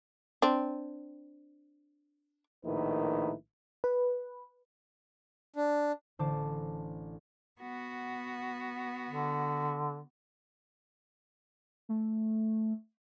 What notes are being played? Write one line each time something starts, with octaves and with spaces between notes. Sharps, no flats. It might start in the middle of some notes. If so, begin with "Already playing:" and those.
C4 D4
A#1 A2 D#3 D#4 E4 B4
B4
D4
A1 D3 C5 A5 D6
B3 F#4
D3
A3